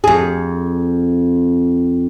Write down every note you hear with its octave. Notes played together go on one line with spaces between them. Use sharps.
F2 G#4